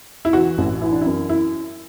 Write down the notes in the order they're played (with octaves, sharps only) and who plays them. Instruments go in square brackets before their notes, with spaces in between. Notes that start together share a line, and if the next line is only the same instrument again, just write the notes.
[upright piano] E4
E3 F#4
A1
E3 E4
D4
F#2 E4
E4